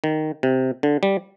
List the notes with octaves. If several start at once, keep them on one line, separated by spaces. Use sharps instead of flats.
D#3
C3
D3
G3